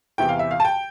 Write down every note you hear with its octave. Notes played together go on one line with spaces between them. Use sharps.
E2 C3 E3 G5
F5
E5
F5
A5
G5